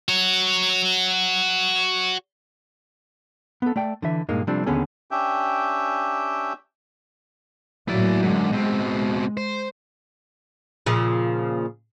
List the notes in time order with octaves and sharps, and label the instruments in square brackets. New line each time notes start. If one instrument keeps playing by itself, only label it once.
[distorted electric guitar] F#4 C#5
[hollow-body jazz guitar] B3 A4
A3 D5 G5
D3 E3 E5
G2 A#2 G#3 A#3 D#4
C3 F3 G3 A3 C4 D4
D#2 D3 B3 C#4 G#4 A4
[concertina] C#4 D4 G4 E5 G5
[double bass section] A2 F#3 A#3 [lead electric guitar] E4 D5
[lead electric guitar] F#2 D3 [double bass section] G#3
[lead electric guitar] B2 C4
C5
[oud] A#2 C#3 F3